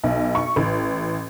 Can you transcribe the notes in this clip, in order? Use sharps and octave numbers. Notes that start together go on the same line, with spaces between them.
B1
C#6
A1